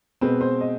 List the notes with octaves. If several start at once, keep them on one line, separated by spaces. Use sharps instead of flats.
B2 G#3 C4 B4
C5
D#5